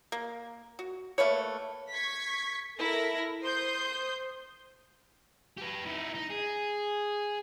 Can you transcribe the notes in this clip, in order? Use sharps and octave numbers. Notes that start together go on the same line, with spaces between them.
A#3
F#4
A3 A#3 B4 C#5
C#6 G#6 B6
E4 A4 A#4 A#6
C5 C6 D#6 G6
G4 B4
D#4 E4
D#4
G#4